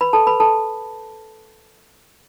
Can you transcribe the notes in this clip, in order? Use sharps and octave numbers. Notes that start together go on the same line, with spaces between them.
B4 B5
A4 A5
B4 B5
A4 A5